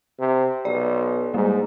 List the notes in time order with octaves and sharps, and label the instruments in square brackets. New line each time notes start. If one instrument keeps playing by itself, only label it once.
[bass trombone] C3
[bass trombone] B1 [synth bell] D5
[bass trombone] G#2 [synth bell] G3 G#3 A#3